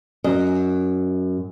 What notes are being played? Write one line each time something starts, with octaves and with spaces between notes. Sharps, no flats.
F#2 D#5